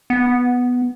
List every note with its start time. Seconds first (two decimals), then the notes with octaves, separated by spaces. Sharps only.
0.10 B3